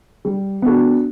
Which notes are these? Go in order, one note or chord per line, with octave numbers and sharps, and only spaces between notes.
G3
B3 D4 F#4 A4